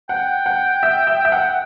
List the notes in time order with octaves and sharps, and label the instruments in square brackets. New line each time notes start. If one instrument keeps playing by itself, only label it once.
[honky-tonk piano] F#5 [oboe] G5
[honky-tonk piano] F#5
E5
E5
E5
F#5